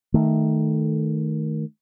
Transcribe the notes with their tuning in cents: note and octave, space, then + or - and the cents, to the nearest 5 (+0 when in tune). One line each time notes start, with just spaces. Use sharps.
D#3 +0 A3 +0